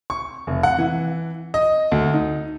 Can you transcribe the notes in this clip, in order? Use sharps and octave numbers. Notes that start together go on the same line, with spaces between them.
C#6
F1
F#5
E3
D#5
D2
D#4